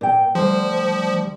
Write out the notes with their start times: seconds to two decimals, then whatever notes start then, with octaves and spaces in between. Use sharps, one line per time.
0.01 A#2 G5
0.35 D2 F3 G3 C5